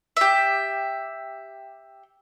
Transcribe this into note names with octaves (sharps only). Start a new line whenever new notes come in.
G4 E5